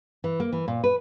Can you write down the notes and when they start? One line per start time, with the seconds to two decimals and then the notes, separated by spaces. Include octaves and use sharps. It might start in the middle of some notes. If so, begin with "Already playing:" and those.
0.24 E3
0.40 A#3
0.53 E3
0.68 A#2
0.84 B4